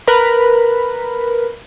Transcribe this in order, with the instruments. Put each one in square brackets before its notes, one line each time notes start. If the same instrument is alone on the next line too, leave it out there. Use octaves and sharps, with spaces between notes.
[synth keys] A#4 B4 B5